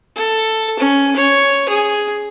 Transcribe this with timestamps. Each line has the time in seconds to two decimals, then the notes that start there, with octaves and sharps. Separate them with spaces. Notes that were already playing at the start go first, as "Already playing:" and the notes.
0.16 A4
0.79 C#4
1.16 C#5
1.69 G#4